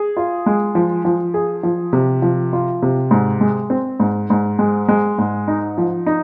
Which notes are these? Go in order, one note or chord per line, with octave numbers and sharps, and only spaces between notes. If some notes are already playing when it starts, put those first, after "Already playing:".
Already playing: G#4
F4
G#3
F3
F3
G#4
F3
C3
F3
F4
C3
G#2
G#3
C4
G#2
G#2
G#3
G#3
G#2
D#4
F3
D#4